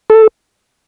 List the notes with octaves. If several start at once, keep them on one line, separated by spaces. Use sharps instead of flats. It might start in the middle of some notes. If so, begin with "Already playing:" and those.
A4